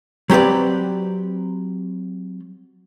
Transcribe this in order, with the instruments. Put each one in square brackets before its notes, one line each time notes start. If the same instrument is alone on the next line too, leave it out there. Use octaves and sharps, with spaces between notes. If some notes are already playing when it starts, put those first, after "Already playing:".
[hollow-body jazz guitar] F#3 C4 G4 B4 D5